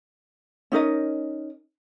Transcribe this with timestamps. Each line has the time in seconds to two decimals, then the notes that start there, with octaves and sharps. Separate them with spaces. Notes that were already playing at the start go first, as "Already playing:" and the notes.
0.72 C#4 D#4 A#4 D#5